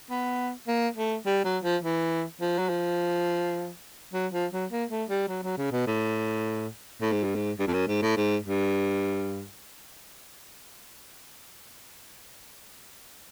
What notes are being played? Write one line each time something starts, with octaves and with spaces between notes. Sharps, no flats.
B3
A#3
A3
G3
F#3
F3
E3
F3
F#3
F3
F#3
F3
F#3
A#3
A3
G3
F#3
F#3
C#3
B2
A2
A2
G#2
G2
G#2
G2
F2
F#2
G#2
A2
G#2
G2